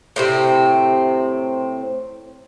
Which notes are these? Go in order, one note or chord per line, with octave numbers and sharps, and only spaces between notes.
A2 C3 C4